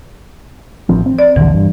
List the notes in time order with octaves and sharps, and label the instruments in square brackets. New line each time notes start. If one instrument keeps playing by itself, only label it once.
[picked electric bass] A1 F3 C4
C4
[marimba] D5
[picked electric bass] D#1 A#1 D3 [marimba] E3
[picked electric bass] G2